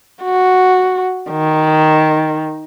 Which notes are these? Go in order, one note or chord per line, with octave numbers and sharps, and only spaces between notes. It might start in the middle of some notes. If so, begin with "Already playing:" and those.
F#4
D#3